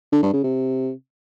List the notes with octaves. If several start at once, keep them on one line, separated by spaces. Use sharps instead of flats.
D3
G2
C#3
C3